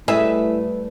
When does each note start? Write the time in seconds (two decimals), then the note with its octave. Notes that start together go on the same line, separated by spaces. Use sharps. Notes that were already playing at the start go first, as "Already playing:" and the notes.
0.08 A2 G3 A3 G#4 B4 D#5 E5